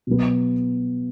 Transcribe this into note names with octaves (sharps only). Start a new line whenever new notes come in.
B2 F#3 B3